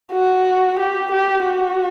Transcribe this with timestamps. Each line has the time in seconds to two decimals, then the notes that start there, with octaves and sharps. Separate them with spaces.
0.12 F#4
0.79 G4
1.11 G4
1.44 F#4